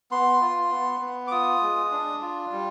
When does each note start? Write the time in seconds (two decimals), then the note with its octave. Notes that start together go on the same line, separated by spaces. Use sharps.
0.11 B3 C6
0.41 F4
0.71 B3
1.01 B3
1.27 D6
1.32 F4 D#6
1.62 G#3
1.91 D4
2.21 F4
2.52 G3